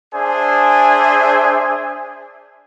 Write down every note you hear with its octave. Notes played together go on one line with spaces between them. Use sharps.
D4 G#4 C5 D5 E5 G#5